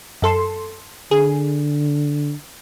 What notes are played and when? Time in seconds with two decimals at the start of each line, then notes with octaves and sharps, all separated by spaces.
0.22 F#2 A4 C6
1.11 D3 G#4